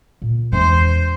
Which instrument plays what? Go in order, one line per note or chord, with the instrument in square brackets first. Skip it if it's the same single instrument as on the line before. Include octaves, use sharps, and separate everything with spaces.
[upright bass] A#2
[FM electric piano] E2 [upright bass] G#3 D4 [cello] C5